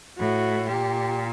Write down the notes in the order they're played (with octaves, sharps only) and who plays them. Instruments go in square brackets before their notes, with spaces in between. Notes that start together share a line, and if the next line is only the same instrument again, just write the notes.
[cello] A2 [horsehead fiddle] F#4
[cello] A#2 [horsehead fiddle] G4